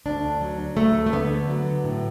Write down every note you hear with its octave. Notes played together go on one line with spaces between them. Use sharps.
D2 D4
F#3
D2 A3
A3
D3 B3
F#3
A2